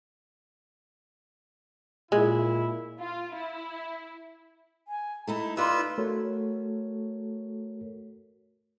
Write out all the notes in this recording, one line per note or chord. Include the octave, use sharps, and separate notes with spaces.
A#2 G#3 E4
F4
E4
G#5
A3 D#4 E4 A#5
D#4 F4 B4 D5 C6 E6
A3 F#4 A4 A#4 C#5